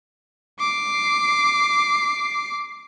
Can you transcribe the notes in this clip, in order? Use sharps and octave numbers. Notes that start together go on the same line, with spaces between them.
D6 C7